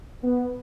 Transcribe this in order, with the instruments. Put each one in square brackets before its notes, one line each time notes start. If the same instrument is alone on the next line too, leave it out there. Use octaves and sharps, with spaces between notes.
[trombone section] B3